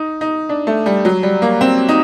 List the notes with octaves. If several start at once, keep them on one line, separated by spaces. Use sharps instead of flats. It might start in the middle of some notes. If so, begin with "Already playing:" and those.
Already playing: D#4
D#4
D4
A3
G3
F#3
G3
A#3
C4
D#4